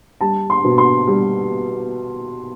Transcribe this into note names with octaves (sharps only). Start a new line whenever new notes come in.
G3 A5
C6
B2
C6
G3